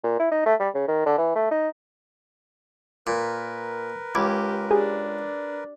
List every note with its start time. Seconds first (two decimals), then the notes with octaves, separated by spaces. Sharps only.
0.04 A#2
0.19 E4
0.31 D#4
0.46 A3
0.60 G3
0.75 C#3
0.88 D#3
1.06 D3
1.18 E3
1.35 A3
1.51 D#4
3.07 A#2 A#4 B4
4.15 C#2 G4 B5 D6 G#6
4.71 D4 G4 G#4 G#5